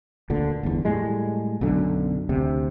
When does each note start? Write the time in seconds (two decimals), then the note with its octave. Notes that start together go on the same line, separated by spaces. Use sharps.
0.30 D2 A#2 D3
0.63 G1 E2
0.85 A2 G3 G#3
1.61 B1 F#2 D3
2.29 D2 C3